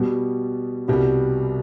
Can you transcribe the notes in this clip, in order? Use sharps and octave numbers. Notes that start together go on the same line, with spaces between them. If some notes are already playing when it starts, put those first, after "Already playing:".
Already playing: B2 G3 B3
C2 B2 G3 B3